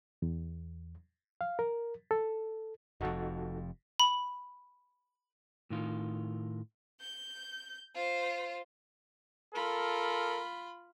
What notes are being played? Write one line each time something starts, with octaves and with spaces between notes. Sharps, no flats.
E2
F5
A#4
A4
F1 F2 D#4 F#4 A4
B5
A2 D#3 F4
G6
F4 C5
F4 A4 A#4 B5